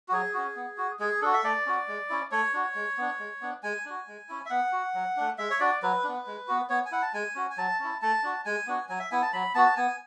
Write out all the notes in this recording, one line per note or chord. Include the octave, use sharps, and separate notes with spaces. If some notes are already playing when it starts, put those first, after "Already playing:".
F#4
F#3 G#4
C#4 F#4
B3
F#4
G#3 G#4
D4 F#4 A4
E5
A3 D5
C#4 F#4
G#3
C#4 E4
A3 C#5
D4 F#4
G#3
B3 D4
G#3
B3 D4
G#3 G#5
D4 F#4
G#3
C#4 E4
E5
B3 F#5
F#4
F#3
A3 D4
G#3 E5
C#5
D4 F#4 D5
F#3 B4
B3 D4
G#3
B3 F#4
B3 C#5
G#5
E4 F#5
A5
G#3 G#5
C#4 F#4
G#5
F#3 A5
C#4 E4
A3 A5
D4 F#4
G#3 G#5
B3 D4 F#4
F#3 G#5
E5
B3 E4 G#5
A5
F#3 B5
B3 F#4 A5
B3 G#5